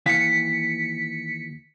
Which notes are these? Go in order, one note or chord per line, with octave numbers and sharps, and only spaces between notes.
D#2 E3 F5 B6 C#7